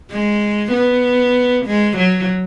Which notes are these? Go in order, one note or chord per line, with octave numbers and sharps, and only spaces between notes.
G#3
B3
G#3
F#3